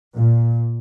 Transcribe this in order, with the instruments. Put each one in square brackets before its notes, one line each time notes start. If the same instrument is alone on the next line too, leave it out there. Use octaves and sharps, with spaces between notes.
[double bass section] A#2